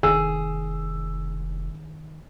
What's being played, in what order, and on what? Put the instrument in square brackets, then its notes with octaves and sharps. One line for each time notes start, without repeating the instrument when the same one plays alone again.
[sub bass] F1 [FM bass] D#3 [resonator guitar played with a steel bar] G#4 [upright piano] E6